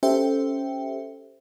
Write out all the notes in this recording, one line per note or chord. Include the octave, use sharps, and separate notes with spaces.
C#4 G4 A4 C5 E5 G5